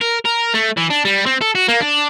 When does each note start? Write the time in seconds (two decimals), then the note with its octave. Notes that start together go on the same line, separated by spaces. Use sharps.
0.01 A#4
0.25 A#4
0.54 A3
0.77 E3
0.90 D4
1.05 G3
1.26 C4
1.41 A4
1.55 F#4
1.68 A#3
1.81 D4